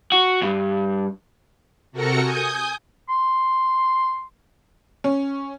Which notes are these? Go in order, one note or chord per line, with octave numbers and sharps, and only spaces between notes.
F#4
G2
C3 F#4 A4 A#4 A#6 C#7
G#5 D#6 G6
C6
C#4